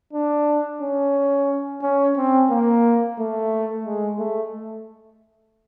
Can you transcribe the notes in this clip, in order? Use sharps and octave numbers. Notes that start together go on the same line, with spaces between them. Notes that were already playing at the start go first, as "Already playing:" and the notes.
D4
C#4
C#4
C4
A#3
A3
G#3
A3